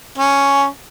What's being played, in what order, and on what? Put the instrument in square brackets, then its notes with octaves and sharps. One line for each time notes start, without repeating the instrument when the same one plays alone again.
[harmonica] C#4